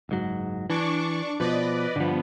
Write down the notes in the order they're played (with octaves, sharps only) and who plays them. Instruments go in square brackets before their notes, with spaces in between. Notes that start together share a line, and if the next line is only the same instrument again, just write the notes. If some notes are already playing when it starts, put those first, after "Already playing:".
[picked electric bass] F#1 G#2 F#3
[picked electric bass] E3 [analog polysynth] D4 C#6 D6
[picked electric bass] B2 F3 [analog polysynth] B4 D5 D#5
[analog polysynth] G2 B3 [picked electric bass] D3 F3